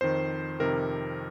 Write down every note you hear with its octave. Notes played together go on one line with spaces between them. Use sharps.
F2 D#3 C5
F2 C3 D#3 A#4